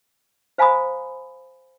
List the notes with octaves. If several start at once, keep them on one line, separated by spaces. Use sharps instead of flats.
C5 F5 G#5 A#5 B5 D#6